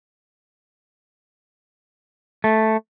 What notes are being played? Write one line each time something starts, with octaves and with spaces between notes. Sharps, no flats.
A3